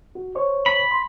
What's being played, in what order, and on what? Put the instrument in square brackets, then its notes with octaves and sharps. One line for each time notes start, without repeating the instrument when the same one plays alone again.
[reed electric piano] F#4
C5 C#5 C#6
[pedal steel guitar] B5
[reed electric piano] C6